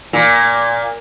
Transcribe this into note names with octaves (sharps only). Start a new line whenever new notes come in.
A#2